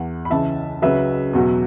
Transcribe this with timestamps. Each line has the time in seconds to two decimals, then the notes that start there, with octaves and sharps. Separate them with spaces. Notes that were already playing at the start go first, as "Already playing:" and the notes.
Already playing: E2 E3 F#5
0.25 B5
0.30 C#2 C#3 E3 E5 A5
0.82 C#2 C#3 F#3 B4 E5
1.33 E2 B2 F#3